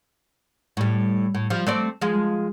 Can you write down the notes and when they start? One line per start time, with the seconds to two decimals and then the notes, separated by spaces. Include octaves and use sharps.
0.77 A2 G3
1.35 A2
1.50 F3 G3
1.67 A3 C4 D5
2.01 F3 G#3